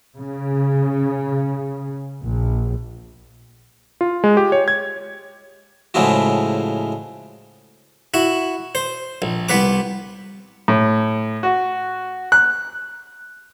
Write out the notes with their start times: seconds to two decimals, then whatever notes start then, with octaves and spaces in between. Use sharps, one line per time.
0.18 C#3
2.23 A#1
4.01 F4
4.24 G#3
4.37 G4
4.52 C#5
4.68 G#6
5.94 A2 C#3 F3 G#3 E4 F#4
8.14 E4 F#4
8.75 C5
9.22 A#1
9.49 C2 B3 B4 D6
10.68 A2
11.43 F#4
12.32 F#6